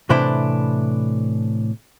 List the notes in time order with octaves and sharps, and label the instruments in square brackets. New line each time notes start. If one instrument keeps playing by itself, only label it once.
[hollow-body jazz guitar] A2 C3 E3 D4 E4 C5